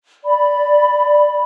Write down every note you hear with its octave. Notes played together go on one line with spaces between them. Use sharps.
D5 B5